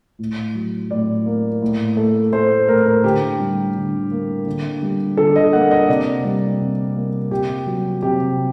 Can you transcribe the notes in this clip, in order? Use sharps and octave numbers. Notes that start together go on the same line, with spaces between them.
A2
F#3
A2 D5
A#3
A2
A3
A3 C5
A2 A#4
A#4
D3 G4
G3
D3
A#3
D3
G3
D3 A4
D#5
A#3 F#5
D#5
C3 D5
G3
C3
A#3
C3 G4
F#3
C3 G4